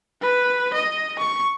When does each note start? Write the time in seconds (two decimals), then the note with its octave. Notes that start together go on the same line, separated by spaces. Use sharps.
0.21 B4
0.73 D#5
1.19 C#6